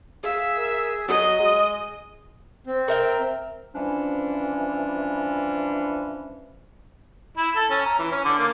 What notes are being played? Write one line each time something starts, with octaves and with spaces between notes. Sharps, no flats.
G#4 E5 F5
A#4
F#3 D#5 D#6
G#3
C4
A#4 E5 G5
E3 F3 G3 C#4 D4
E4
A4
C#4
A#5
E3
C#4
D3
A#3